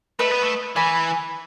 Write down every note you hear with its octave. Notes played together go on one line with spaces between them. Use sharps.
A3 B4 D#5
B3
A3
E3 G#5 B5